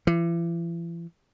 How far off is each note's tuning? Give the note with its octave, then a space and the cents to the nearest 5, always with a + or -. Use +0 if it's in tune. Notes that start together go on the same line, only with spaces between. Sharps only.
E3 +40